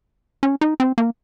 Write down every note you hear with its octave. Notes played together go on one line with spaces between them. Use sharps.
C#4
D#4
C4
A#3